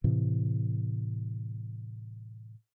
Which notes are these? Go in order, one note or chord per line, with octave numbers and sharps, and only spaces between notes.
A2 C3 E3